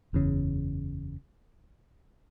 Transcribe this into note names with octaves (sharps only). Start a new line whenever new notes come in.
F#1 E2 C#3